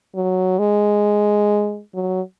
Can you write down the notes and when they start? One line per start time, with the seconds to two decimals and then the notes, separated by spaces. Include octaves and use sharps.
0.15 F#3
0.59 G#3
1.94 F#3